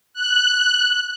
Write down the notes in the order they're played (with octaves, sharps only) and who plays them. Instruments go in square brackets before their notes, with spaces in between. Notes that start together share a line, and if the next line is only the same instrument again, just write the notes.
[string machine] F#6